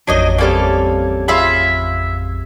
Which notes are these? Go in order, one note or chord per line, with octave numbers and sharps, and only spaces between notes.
A1 F2 F#3 D4 D#4 D#5 G#6
C3 G3 A#3 C#4 A4 F5
F4 G#4 E5 F5 B5